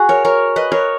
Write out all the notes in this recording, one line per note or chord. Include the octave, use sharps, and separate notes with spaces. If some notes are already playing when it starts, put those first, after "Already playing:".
Already playing: F#4 G#4
A#4 C#5
A#4 C#5
B4 D#5
A#4 C#5